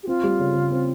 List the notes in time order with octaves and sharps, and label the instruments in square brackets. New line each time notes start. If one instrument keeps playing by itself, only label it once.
[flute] G4
[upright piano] C4 [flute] F4
[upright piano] G3
C#3
C#3
C4